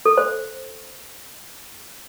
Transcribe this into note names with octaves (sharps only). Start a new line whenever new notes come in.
A4
C5